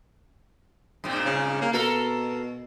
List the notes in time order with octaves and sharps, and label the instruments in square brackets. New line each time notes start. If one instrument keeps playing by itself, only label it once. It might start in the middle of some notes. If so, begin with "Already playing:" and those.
[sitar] G2 A#2 C4
[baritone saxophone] C#3
A#3
[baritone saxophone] B2 [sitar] A4 A#4